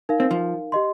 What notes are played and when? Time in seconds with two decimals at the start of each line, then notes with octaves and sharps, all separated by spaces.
0.09 D#4 A#4 F5
0.20 C4
0.31 F3
0.72 G4 D#5 C6